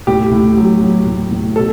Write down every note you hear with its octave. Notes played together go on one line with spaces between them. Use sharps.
A2 G4
A2
F#3
F#3
A2
A2
B2 A4